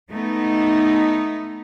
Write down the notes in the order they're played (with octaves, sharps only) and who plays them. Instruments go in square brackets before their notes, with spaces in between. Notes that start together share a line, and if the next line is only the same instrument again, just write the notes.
[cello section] A3 B3 D#4